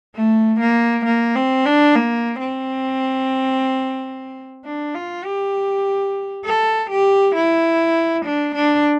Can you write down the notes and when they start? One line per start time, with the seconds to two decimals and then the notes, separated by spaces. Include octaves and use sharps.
0.15 A3
0.60 A#3
1.05 A#3
1.35 C4
1.65 D4
1.95 A#3
2.40 C4
4.64 D4
4.95 F4
5.24 G4
6.45 A4
6.90 G4
7.35 E4
8.25 D4
8.55 D4